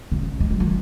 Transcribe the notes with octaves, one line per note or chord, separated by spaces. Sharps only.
C#3
G#3
F#3
D#3